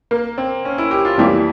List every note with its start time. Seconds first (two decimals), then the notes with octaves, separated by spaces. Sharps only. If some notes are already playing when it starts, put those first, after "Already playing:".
0.11 A#3
0.38 C4
0.65 C#4
0.78 E4
0.91 G4
1.05 F4
1.18 F2 E3 G3 A#3 E4 G4